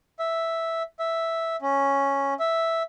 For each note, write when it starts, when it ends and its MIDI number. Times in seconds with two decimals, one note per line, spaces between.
0.19 0.83 76
0.99 1.56 76
1.62 2.34 61
2.40 2.83 76